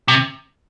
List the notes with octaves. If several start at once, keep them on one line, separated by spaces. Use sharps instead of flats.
C3